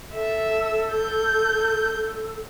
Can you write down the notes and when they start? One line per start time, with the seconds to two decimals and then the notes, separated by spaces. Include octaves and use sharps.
0.14 A4 E5
0.92 G6